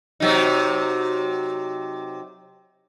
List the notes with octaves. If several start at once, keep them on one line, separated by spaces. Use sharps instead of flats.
C3 F#3 D#4